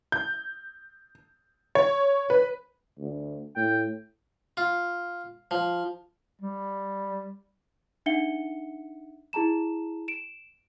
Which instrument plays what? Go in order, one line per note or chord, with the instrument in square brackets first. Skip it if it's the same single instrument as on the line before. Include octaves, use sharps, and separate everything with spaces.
[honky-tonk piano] G6
C#5
B4
[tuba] D2
[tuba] A2 [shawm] G5
[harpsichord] F4
F3
[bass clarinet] G3
[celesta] D4 D#4 E5 F#5 C#7 G7
E4 G#4 A5 A#5 E7
D7 E7